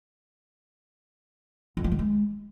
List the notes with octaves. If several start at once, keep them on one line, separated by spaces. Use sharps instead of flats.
F2
F3
D#3
G#3